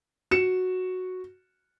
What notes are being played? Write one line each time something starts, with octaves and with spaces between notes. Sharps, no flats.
F#4 C#7 E7